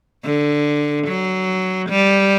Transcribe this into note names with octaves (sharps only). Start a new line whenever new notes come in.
D3
F#3
G3